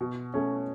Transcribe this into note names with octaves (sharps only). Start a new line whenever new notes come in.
B2
A3 C#4